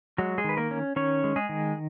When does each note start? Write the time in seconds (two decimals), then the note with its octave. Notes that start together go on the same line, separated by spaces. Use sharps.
0.18 F#3 G#3 F#4
0.38 G#3 G#4
0.44 D#3 B4
0.57 A#3 A#4
0.71 C#4
0.96 D#3 C#4 C#5
1.24 G#3
1.36 G#3 G#4
1.49 D#3